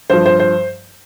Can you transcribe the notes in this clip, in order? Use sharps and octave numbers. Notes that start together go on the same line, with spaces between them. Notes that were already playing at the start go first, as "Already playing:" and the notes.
G2 F3 C5
C5
C5